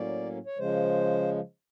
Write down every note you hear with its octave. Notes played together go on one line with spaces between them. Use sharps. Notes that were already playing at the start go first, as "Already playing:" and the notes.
Already playing: A2 F#3 A#3 C#4 D5
C#5
C#3 F3 G#3 C5